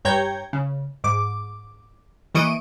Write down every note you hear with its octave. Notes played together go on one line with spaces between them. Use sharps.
G2 C#5 G5 A#5 G6 G#6
C#3
G#2 D6
E3 A#3 D#5 C#6 D7 D#7